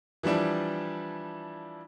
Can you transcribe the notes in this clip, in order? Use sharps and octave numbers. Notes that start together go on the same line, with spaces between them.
E3 F3 G3 D4 E4